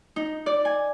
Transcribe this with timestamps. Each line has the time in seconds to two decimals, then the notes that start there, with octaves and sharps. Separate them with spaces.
0.16 D#4
0.46 D5
0.65 G#5